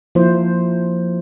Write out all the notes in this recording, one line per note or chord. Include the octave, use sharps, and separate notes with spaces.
F3 A#3 E4 C5